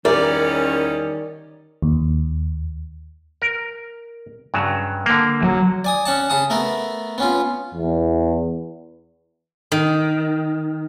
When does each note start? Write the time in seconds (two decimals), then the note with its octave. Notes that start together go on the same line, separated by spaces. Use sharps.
0.05 E2 D#3 G3 C#4 A#4 D5
1.82 D#2
3.42 A#4
4.54 G2 C#3 F#3
5.06 D3 A#3
5.43 F#3
5.84 D5 G#5 D#6
6.06 C#4 F#5 A5
6.30 C#3 A5 D#6
6.50 A3 B3 A#4
7.18 B3 C#4 F4
7.74 E2
9.72 D#3